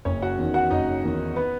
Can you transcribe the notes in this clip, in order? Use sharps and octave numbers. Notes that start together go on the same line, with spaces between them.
F#1 C#4 C#5
F#4 F#5
E2 D#3
F#4 F#5
F#1 D#4 D#5
E2 D#3
B3 B4